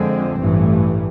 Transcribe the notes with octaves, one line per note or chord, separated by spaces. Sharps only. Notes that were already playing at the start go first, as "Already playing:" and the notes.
Already playing: F2 D3 F3 G#3 C4
A1 G2 E3 A3